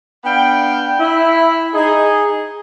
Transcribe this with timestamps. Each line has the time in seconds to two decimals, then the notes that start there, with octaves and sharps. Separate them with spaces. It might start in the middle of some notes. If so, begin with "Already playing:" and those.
0.24 B3 D4 F5 G5
0.99 E4
1.73 D#4 G#4